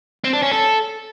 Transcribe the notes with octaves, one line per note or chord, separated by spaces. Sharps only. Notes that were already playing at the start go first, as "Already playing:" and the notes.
C4
D4
C#4
A4